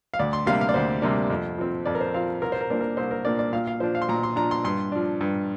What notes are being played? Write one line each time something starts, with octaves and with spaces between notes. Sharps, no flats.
F5
D2 D5
C6
C3 G3 A#3 D4 F5
F5
D5
D2 C5
C3 G3 A#3 D4
F2
F3 C4
F2 D5
A#4
C5
F3 C4 F5
C2 A#4
C5
A#4
A#2 A#3 D4 C5
A#4
C2 C5
A#4
A#2 A#3 D4 D5
D5
A#2 F5
F5
F3 D4 C5
F5
C6
A#2 A#5
C6
F3 D4 A#5
C6
G2 C6
F3 D4
G2